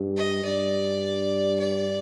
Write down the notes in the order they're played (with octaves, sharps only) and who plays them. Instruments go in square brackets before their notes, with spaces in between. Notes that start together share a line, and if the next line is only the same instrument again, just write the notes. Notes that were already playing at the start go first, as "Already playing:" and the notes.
Already playing: [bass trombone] G2
[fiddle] D#5
[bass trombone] G2 [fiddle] D5
[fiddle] D5